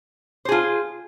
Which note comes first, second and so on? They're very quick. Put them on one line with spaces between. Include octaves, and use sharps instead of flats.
C5 G#4 F4